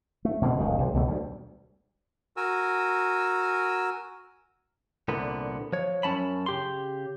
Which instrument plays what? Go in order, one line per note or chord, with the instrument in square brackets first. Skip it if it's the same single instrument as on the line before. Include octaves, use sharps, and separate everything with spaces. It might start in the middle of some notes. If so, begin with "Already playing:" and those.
[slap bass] A3
B2 D3 F3 C4
D1 C#2 D#3
B1 C3
C#2 B2 A3
D2 F3 G3
[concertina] F#4 A#4 G#5 E6
[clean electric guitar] C2 A#2 D3 B3
F3 C#5
F#2 A#3 C#4 A5 B5
C#3 G4 C6